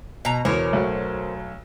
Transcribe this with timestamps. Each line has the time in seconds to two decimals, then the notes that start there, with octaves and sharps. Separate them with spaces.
0.25 B2 A#5
0.45 E2 B2 A#4 C5 C#5
0.73 B1 A3 F#4